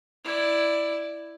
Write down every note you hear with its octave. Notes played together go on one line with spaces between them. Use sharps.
E4 D5